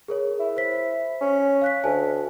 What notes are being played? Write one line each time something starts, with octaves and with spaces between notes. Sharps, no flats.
G#4 A#4 C#5
E4
C5 B6
C#4
F5 F#6 B6
D2 G#5 A5